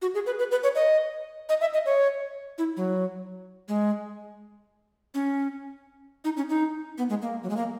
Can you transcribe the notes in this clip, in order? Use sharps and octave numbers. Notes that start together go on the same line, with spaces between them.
F#4
G#4
B4
B4
B4
C#5
D#5
D#5
E5
D#5
C#5
E4
F#3
G#3
C#4
D#4
C#4
D#4
B3
G#3
A#3
F#3
G#3
A#3